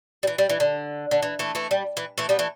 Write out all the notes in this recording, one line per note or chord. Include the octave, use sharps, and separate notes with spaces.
G3
E3
G3
E3
D3
D3
E3
E3 A3
E3 A3
G3
E3
E3 A3
G3 B3
E3 A3